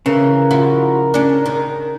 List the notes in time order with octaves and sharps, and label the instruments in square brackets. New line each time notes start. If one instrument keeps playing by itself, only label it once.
[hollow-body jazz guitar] C#3 [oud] E3 [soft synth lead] A#4
[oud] F3 E4 F#4
C#4 D4
D#3